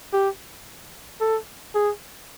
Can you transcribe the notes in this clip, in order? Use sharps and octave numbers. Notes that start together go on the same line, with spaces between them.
G4
A4
G#4